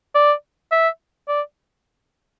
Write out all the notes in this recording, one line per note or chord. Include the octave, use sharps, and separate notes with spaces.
D5
E5
D5